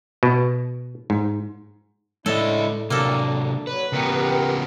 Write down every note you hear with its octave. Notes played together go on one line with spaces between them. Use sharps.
B2
G#2
A2 G#3 D4 E4 A4 C#5 D#5
C3 F#3 A#3 D4 A4
F#3 B4
C#3 B3 G4 A#4